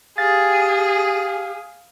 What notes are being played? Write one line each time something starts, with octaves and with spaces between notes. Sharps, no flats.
G4 G#4 F5 A6